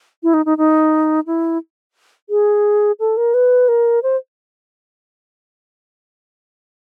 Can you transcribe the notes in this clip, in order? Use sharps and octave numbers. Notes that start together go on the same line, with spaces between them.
E4
D#4
D#4
D#4
E4
G#4
A4
A#4
B4
A#4
C5